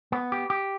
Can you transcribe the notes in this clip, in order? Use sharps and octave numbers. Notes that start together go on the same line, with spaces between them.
B3
G4
G4